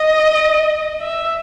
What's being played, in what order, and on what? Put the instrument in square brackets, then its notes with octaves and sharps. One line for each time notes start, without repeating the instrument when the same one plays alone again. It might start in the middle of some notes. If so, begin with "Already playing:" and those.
Already playing: [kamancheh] D#5
E5